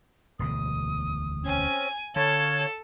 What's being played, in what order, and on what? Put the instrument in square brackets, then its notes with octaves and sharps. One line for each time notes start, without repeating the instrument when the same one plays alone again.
[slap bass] E1 D2 B2 [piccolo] D#6
[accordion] C4 C#4 [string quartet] G#5
[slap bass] D3 [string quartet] A4 [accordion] C#5 F5 A5 [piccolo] G#6